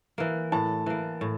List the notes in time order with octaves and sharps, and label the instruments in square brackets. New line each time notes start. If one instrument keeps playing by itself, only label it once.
[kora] E3 A#3
[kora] A2 [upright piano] A5
[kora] E3 A#3
A2